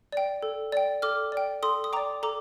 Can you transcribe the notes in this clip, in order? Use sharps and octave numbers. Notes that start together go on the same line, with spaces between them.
D5 G5
A4
D5 G5
A4 D6 F6
D5 G5
A4 C6 D#6
D#6
D5 G5 A#5 D6
A4 A#5 D6